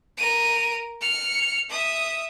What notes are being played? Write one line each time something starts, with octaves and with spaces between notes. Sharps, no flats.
A#4 D#7
F6 C#7
E5 D#6